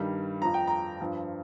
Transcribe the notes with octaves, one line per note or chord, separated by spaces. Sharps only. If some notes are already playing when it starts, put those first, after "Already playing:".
Already playing: G2 D#3 G3
F2 F3 A#5
G5
A#5
G2 F3